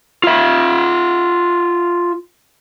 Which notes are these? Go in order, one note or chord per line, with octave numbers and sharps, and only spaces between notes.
F4 E5